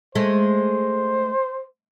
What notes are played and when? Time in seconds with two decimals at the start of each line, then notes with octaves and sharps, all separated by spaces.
0.15 G#3 A3 C5